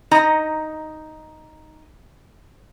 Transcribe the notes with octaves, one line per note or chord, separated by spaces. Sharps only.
D#4 D#5 A#5